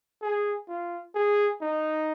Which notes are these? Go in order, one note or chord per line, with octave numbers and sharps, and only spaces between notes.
G#4
F4
G#4
D#4